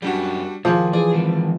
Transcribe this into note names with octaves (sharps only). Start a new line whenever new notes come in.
F#2 G3 D4 F#4 G4
D#2 F3 G#4 D6 D#6
E3 G#4 D5
G#2 D#3